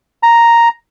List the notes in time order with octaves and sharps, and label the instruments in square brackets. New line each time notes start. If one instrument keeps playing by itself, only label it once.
[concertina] A#5